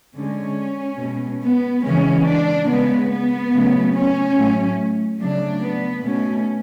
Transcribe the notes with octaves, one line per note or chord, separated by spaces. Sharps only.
D3 G#3 C#4
B2 G#3
B3
C#3 E3 G#3 C#4
D4
C#3 G#3 B3
B3
C#3 F#3 A3
C#4
A2 F#3 A3
C#3 F#3 A3 D4
B3
B2 A3 C#4